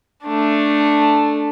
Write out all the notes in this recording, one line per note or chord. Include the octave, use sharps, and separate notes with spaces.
A3 D4